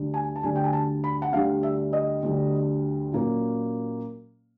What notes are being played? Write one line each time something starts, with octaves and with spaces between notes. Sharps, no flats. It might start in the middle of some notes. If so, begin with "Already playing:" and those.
Already playing: D2 D3 G3
G#5
A5
D2 D3 G3 G#5
G5
G#5
A5
B5
F#5
D2 D3 G3 F5
E5
D#5
D2 D3 G3
A#2 F#3 A#3 C#4